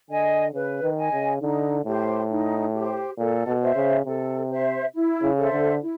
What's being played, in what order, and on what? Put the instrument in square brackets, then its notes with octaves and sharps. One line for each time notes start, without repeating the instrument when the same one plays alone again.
[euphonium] D3 [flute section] D#5 G#5
[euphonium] C#3 [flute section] B4
[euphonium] D#3
[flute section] D#5 G#5
[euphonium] C#3
[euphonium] D3 [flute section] D#4
[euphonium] A2 [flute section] G4 C5
[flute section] D#4
G4 C5
[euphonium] A#2 [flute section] A4
[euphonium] B2
[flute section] C5 E5
[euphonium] C#3
[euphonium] C3 [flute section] A4
[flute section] C5 E5
E4
[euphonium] C#3
[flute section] A4 C5 E5
[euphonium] D3
[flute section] E4